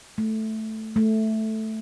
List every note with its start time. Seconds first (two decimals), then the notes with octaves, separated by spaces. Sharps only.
0.18 A3
0.96 A3